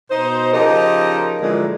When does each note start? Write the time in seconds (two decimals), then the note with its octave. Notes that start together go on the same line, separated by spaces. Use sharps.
0.11 B2 D#4 C5
0.53 C#3 F3 D#4 G4 A#4 D#5
1.42 F#2 A#2 D3 E3 F3 G#3